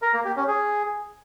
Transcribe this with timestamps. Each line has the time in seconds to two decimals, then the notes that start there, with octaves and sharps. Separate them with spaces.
0.02 A#4
0.13 A#3
0.25 G4
0.36 C#4
0.48 G#4